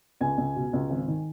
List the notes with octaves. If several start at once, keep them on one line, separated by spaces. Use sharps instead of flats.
C#2 G#5
C#2
B2
C#2
G#1
D#3